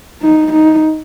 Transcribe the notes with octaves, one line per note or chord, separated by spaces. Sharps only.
D#4
D#4